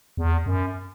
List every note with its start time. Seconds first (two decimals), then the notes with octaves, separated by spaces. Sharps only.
0.17 E2
0.46 F#2